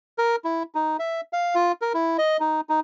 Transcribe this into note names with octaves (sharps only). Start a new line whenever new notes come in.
A#4
E4
D#4
E5
F5
F4
A#4
E4
D#5
D#4
D#4